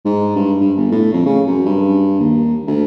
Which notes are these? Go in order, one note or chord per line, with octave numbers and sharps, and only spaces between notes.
G#2
G2
G2
G1
A2
F2
C#3
F#2
G2
D#2
D2